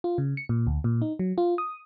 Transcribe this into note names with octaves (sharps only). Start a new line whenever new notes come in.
F4
C#3
C#7
A#2
D2
A#2
D#4
F#3
F4
D#6